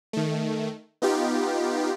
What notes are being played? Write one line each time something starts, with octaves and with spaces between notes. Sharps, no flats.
D#3 A3
B3 D#4 F4 G4